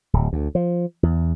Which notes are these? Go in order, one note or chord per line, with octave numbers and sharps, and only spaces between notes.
D1
D2
F3
E2